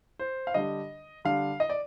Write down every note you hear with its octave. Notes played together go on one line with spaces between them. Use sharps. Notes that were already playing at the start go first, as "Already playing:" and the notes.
C5
F5
D3 G3 D4 D#5
D3 G3 D4 F5
D#5
D5